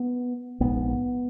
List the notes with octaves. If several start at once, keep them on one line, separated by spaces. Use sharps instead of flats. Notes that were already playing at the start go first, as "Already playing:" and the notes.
Already playing: B3
A#1 G#2 B3